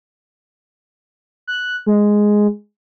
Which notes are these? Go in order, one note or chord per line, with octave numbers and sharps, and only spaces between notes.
F#6
G#3